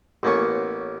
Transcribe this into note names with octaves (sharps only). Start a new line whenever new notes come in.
A1 A#3 B3 C#4 C#6